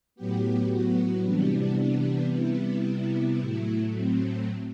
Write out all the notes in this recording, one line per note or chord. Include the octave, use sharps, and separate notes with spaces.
A2 F#3 B3 G4
F#4
C3 E3 G3 B3 D4
D4
C3 G3 B3 E4
A2 F#3 A3
C4